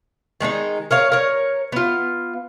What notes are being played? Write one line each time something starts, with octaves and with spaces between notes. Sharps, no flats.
D#3 G#3 C#4 D#4
A#4 C#5 F5
A#4 C#5
B3 F4